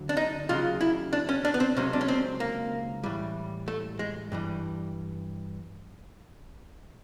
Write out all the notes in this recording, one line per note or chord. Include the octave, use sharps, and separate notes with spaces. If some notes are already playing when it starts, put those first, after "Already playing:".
Already playing: D2 D3 F#3
D4
D#4
D#2 C#3 F#3 F4
E4
D4
C#4
D4
B3
C4
C#2 C3 D#3 F#3 C#4
D4
C#4
C4
A#3
A2 E3 G3
A3
G#3
G2 E3 G3